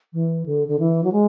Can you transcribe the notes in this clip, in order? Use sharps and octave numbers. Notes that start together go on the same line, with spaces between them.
E3
D3
D3
E3
F#3
G#3